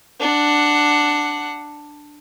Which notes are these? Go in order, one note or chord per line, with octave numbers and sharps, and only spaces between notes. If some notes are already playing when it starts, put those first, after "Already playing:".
D4 F#5